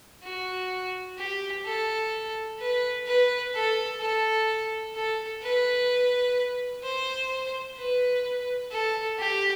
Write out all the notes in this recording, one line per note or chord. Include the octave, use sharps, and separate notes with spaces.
F#4
G4
A4
B4
B4
A4
A4
A4
B4
C5
B4
A4
G4